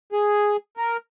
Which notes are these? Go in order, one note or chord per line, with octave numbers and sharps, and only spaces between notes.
G#4
A#4